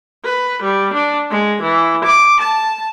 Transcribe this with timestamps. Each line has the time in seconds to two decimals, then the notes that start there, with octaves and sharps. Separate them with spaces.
0.25 B4
0.63 G3
0.94 D4
1.31 G#3
1.62 E3
2.05 D6
2.41 A5